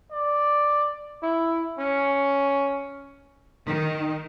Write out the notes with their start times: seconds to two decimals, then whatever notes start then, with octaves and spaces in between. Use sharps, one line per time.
0.12 D5
1.23 E4
1.79 C#4
3.67 D#3